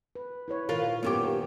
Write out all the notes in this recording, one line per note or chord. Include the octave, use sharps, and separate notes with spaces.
B4
E4 B4 C#5
A#2 D#3 F4 A#4 B4
F#2 D#3 A#3 B3 G4 C#5